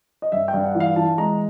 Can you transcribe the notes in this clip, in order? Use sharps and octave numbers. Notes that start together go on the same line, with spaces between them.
D#5
G2 E5
G5
G2
F#5
E3
F5
E3 A5
G#3 A#5